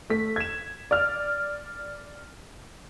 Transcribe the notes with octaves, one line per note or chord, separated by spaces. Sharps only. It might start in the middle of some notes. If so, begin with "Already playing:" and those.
A3 B6
G#6 E7
D5 F6